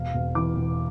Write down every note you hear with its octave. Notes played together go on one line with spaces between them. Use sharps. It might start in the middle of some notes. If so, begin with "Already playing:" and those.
Already playing: E1 F5
E1
E3 D6
E1